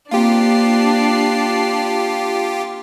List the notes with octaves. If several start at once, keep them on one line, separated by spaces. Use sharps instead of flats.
A#3 C4 D4 F4 G4 C7